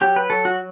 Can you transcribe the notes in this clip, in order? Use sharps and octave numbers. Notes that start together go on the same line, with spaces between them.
F#3 G4
B4
F#3 A4
F#4